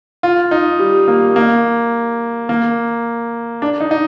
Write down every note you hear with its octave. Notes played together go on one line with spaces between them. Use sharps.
F4
D#4
G3
A#3
A#3
A#3
D4
D#4
D#4